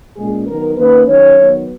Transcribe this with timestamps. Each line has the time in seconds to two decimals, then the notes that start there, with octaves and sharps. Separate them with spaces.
0.17 A#2 G#3 C#4 G#4
0.47 D#3 F#3 B3 A#4
0.78 D#3 A#3 C#4 B4
1.08 D#3 F#3 C#4 C#5
1.38 D#3 F#3 B3